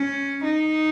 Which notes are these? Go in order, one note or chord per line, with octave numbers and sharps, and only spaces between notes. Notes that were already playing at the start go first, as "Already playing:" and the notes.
Already playing: C#4
D#4